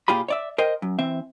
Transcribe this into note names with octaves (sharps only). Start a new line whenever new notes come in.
A#2 F4 G4 G#4 B5
C#5 D5 E5
A#4 C5 D#5 G5
F#2
E3 C4 E5